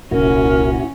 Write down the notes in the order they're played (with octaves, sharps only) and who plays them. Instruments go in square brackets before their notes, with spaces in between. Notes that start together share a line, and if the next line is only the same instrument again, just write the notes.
[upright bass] D#1 C2 [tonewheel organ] A#2 E4 F#4 [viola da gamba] C#4 [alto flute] A#4